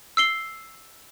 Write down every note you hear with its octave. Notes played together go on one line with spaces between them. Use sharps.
E6 C7 G7